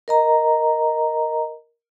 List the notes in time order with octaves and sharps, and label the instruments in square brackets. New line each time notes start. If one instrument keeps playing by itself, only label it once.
[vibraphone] A#4 D#5 A#5